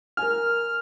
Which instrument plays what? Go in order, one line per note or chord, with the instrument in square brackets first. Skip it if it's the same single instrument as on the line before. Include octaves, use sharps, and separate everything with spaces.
[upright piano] A#4 G#5 [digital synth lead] F6